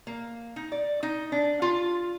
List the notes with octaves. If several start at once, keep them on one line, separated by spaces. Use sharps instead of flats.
A#3
D#4
D5
D#4
D4
F4